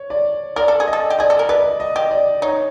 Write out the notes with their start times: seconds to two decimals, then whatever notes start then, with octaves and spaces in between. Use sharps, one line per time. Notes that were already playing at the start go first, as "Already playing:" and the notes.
Already playing: C#5
0.10 D5
0.56 A#4 D5
0.68 A4
0.80 G#4
0.87 D#5
0.93 A4
1.10 G4
1.19 G#4 D5
1.30 A4
1.39 A#4
1.49 B4 D5
1.80 D#5
1.96 G4
2.11 D5
2.42 D#4 C#5